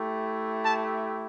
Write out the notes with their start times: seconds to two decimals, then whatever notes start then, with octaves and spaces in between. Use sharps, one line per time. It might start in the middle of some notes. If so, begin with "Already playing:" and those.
Already playing: A3 E4 G4
0.64 A5